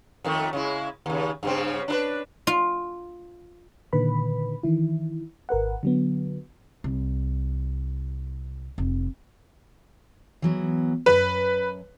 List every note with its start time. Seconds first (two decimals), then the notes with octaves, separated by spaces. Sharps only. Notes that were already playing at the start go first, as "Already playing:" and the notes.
0.24 F2 D#3 A3
0.53 C#3 G#3 E4
1.06 D#2 C#3
1.43 G2 C#3 C4
1.88 D4 D#4 B4
2.47 F4
3.93 A#2 D3 D#3 B4 B5
4.63 D#3 E3 E4
5.49 G#1 A#4 B4 F#5
5.83 D3 F#3 B3
6.84 C2
8.78 F1
10.42 E3 F#3 B3
11.06 F#2 B4